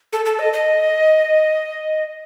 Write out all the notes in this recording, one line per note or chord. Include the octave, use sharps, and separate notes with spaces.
A4
A4
D#5
D#5